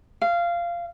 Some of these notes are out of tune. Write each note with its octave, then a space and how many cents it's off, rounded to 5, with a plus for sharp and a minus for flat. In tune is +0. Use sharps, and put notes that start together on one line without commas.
F5 -15